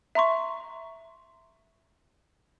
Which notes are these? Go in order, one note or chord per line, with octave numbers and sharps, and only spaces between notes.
E5 A#5 C6 C#6